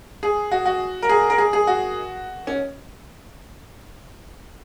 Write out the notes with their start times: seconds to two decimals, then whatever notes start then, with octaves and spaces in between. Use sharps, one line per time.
0.23 G#4
0.52 F#4
0.66 F#4
1.02 A#4
1.09 G#4
1.30 A#4
1.38 G#4
1.53 G#4
1.67 F#4
2.47 C#4